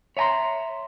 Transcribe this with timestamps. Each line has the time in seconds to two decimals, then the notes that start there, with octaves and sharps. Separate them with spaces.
0.17 C#5 E5 G#5 A#5 C6